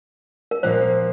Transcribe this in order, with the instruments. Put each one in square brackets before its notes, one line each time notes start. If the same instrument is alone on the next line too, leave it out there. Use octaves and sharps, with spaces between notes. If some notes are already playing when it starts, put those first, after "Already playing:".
[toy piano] A#4
[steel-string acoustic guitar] A#2 F3 A#3 [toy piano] C5